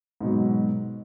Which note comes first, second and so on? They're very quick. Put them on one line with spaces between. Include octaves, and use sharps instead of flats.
G#2 B2 F#3